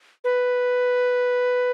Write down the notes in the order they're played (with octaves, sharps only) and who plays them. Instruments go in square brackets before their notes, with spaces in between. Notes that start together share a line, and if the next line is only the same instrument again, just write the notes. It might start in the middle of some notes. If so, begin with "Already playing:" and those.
[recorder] B4